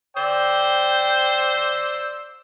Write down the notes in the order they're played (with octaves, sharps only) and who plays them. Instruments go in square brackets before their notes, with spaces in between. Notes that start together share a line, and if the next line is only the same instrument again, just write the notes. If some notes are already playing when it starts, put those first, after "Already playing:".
[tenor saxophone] C5 [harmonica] D5 E6 [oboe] G5